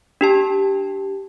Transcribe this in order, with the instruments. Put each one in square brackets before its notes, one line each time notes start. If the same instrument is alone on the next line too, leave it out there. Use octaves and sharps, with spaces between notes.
[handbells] D4 G4 A5